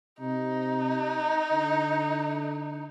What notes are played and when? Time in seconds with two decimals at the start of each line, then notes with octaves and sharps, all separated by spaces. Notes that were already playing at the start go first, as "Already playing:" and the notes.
0.20 C3 D#4
1.52 D3